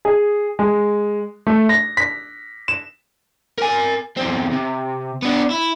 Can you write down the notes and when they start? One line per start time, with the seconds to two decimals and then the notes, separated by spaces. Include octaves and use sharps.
0.05 G#4
0.59 G#3
1.47 A3
1.69 A#6
1.97 B6
2.68 E7
3.58 A#4 G#5
4.17 E2 C4
4.52 C3
5.22 B3 D4
5.50 E4